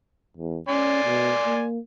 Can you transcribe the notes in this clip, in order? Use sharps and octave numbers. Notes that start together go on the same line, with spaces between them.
E2
C#4 D5 G#5 C6
B2
A#3